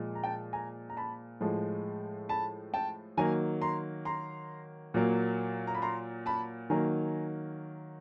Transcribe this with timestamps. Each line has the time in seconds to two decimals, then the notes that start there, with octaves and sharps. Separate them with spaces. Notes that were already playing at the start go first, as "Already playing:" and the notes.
Already playing: A#2 F3 G#3
0.15 A#5
0.24 G5 A5
0.53 G#5 A#5
0.90 A#5
0.97 A5 B5
1.41 A2 F3 G#3
2.29 A5 B5
2.74 G5 A5
3.17 D#3 F#3 A#3 G#5 A#5
3.61 A#5 C6
4.05 A#5 C6
4.94 A#2 F#3 A#3
5.67 A#5
5.75 B5
5.82 A#5 C6
6.26 A5 B5
6.70 D#3 F#3 A#3 G#5 A#5